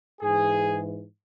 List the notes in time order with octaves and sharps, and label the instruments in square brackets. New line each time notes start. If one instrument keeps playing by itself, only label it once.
[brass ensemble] G#2 E3 G#4